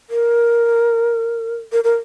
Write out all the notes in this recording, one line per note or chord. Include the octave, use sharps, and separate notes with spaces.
A#4
A#4
A#4